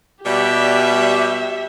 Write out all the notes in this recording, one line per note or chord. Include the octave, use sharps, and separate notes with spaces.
B2 G3 G4 E5